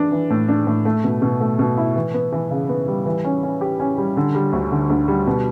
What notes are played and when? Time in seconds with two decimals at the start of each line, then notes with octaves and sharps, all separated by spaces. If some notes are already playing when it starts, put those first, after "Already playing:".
Already playing: E3 D4
0.12 E3
0.30 A2
0.48 D4
0.67 A2
0.85 A3
1.04 B2
1.22 B2
1.41 A3
1.59 B2
1.77 E4
1.96 E3
2.14 B3
2.32 E3
2.51 C#3
2.69 B3
2.88 G3
3.06 E3
3.24 C#4
3.43 C#4
3.61 G4
3.80 C#4
3.98 G3
4.17 D3
4.35 G3
4.53 D2
4.72 D3
4.90 D2
5.08 G3
5.27 B2